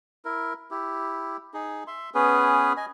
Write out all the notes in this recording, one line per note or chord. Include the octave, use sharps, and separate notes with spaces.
E4 A#4
E4 G4
D#4 G#4
E5 C6
B3 C#4 G#4 B4
D#5 G#5